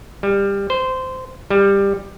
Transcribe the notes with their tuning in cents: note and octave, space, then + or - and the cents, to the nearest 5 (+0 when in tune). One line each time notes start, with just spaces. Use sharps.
G3 +20
C5 -15
G3 +15